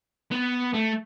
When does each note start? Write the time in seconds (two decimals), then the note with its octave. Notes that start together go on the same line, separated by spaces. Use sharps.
0.31 B3
0.73 A3